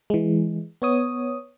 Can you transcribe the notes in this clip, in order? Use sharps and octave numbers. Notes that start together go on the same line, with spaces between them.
E3 G#3
B3 C#5 D#6